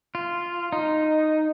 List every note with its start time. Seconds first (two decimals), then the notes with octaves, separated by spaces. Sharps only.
0.15 F4
0.73 D#4